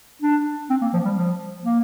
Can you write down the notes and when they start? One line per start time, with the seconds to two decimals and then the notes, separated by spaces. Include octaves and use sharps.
0.22 D4
0.70 C4
0.81 A#3
0.94 F3
1.05 G3
1.17 F3
1.64 A#3